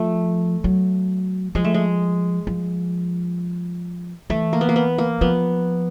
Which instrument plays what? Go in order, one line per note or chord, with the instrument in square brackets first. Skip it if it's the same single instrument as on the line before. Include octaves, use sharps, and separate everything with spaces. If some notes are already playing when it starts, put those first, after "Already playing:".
Already playing: [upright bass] F3 [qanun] A3
[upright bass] F#3
[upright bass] F3 [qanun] G#3
[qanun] A3
G#3
[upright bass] F3
[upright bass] E3 [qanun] A3
[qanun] A#3
B3
A#3
B3
A#3
[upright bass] F3 [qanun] B3